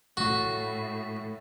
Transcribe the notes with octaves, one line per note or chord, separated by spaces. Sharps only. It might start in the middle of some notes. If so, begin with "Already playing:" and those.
A2 A3 F#4